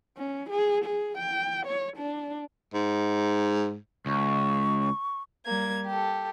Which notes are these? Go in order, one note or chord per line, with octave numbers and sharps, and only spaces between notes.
C#4
G#4
G#4
G5
C#5
D4
G#2
C#2 C#6
G3 A#3 G#6
G4 A4